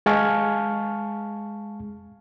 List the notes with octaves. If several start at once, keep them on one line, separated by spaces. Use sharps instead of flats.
G#3 F5 G#5 A5 C#6 F6